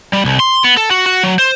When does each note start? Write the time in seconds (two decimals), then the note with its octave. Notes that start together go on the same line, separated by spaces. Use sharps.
0.13 G3
0.25 C2
0.40 C6
0.64 B3
0.77 A4
0.91 F#4
1.06 F#4
1.23 F#3
1.39 C5